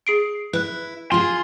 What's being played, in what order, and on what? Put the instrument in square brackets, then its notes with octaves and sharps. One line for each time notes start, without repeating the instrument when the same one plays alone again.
[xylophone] G#4 C7 D7
[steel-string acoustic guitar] E4 [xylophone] B4 F#6
[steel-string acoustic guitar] F4 G#4 [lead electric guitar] C6